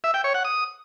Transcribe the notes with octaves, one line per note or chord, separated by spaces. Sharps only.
E5
G5
C#5
F#5
D#6